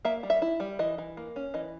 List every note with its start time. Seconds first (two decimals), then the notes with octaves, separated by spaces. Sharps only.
0.05 A#3 E5
0.23 G3
0.30 E5
0.42 E4
0.60 G3
0.79 E3 D#5
0.98 E3
1.17 A#3
1.36 C#4
1.54 E3 D#5